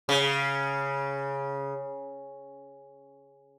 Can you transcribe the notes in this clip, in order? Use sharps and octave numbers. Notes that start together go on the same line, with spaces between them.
C#3